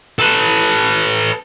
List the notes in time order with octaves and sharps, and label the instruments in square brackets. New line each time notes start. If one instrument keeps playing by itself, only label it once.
[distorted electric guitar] A4 B4